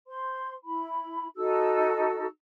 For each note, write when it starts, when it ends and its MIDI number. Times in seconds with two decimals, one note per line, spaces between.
0.07 0.52 72
0.07 0.52 84
0.64 1.27 64
0.64 1.27 83
1.35 2.25 63
1.35 2.25 66
1.35 2.25 69
1.35 2.25 88